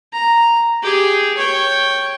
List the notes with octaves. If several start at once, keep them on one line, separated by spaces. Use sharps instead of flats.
A#5
G4 G#4
C#5 G5